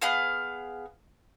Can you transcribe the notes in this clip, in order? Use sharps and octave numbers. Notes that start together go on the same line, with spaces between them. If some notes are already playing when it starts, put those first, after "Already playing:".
B3 G#4 F5 D#6